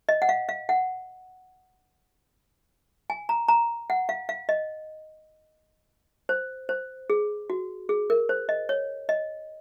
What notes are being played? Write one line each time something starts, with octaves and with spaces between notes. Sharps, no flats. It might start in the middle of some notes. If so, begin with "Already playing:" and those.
D#5
F#5
F5
F5
F#5
G#5
A#5
A#5
F#5
F5
F5
D#5
C5
C5
G#4
F#4
G#4
A#4
C5
D#5
C#5
D#5